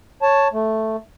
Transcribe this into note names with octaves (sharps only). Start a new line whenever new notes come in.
C#5 A5
A3